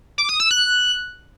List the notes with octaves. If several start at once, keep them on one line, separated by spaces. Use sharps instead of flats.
D6
D#6
E6
F#6